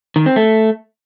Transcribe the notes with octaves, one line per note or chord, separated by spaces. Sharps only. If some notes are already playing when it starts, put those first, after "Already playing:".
D#3
C4
A3